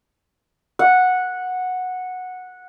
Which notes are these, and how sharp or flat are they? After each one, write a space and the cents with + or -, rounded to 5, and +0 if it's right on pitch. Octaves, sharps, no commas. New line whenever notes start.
F#5 -10